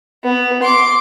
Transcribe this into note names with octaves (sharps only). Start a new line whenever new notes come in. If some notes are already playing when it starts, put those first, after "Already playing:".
B3
C6 D6